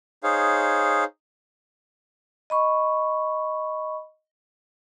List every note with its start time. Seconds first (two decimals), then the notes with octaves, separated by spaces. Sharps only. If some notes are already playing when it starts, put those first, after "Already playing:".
0.23 D#4 G#4 C5 C#5 F5
2.50 D#5 B5 C#6